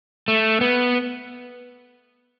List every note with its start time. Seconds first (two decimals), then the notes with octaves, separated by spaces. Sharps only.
0.28 A3
0.61 B3